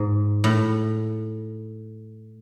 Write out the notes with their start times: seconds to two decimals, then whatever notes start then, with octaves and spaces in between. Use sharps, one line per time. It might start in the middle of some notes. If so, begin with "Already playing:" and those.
Already playing: G#2
0.44 A2